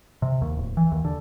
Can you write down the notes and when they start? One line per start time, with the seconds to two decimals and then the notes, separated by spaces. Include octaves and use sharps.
0.22 C3
0.42 D#2
0.57 D1
0.77 E3
0.92 D#2
1.05 D3